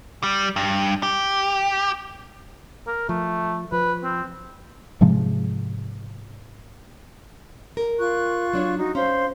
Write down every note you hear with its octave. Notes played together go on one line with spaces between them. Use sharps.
G3
G2
G4
A#4
F3 A3
F3 B4
C4
G#2 C3 F3 G#3
A#4
F4 C#6 F#6
F#3 D4 C#5
D#4 F#4
C#4 C5 F5 C6